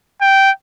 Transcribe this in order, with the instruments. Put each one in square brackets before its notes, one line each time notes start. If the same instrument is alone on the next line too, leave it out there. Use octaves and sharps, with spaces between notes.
[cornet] G5